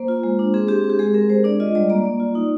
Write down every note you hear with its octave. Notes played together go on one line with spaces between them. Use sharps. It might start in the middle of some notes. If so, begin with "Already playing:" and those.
Already playing: A#3 C5
F4
G#3
D4
C4 G#4
C4 G4
C4
G4
G#3 G#4
C4 A#4
G#3 C5
D4 D5
F4 D#5
G3 D5
A#3 D5
A#3
F4
D#4